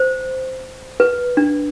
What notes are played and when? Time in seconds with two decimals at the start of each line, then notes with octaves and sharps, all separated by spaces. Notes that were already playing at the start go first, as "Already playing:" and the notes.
Already playing: C5
1.00 B4
1.37 D4